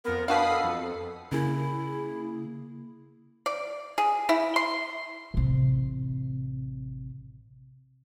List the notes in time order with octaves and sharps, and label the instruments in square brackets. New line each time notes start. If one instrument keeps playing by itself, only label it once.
[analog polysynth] F2 B3 [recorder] A#4
[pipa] B2 F#4 F5 [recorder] D4 [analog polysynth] B5 D#6 C7
[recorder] A4
[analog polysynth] F2
[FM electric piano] C#3 A#3 G#4 [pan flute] E4
[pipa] D5
G#4
E4
C6
[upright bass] A1 C3